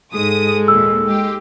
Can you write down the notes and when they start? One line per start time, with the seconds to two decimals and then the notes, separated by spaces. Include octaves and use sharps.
0.14 G#2 G#3 A4 D#6
0.68 D#2 A#2 E6
1.06 G#3 G4